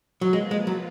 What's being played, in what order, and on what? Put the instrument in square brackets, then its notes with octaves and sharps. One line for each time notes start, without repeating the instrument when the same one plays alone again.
[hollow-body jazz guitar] F#3
[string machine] F3 A#3 F4 B4 [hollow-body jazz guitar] G#3
[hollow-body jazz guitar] G#3
F#3